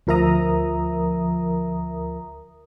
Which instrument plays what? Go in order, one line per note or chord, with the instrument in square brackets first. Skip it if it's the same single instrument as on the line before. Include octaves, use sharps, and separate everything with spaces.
[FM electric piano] D2 F3 A#4 E5 A#5 D#6